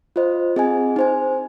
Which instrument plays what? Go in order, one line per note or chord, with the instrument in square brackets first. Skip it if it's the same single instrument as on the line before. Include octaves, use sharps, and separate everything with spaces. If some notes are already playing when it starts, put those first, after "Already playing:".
[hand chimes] F4 C5 D#5
C4 G#4 D#5 G#5
D#4 C5 G#5